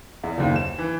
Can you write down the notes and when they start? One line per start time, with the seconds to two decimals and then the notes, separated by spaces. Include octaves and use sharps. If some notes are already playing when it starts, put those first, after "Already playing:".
0.23 E2
0.38 F#1 D#2
0.56 E7
0.78 E3